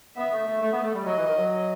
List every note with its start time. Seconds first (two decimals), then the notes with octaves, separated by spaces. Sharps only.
0.17 B3 E5
0.32 A3
0.46 A3
0.61 A3
0.72 B3
0.83 A3
0.94 G3
1.05 F#3 D#5
1.16 E3
1.27 D#3
1.38 F#3